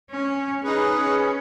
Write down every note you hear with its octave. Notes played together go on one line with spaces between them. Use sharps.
C#4
C#4 D#4 G#4 B4
C#4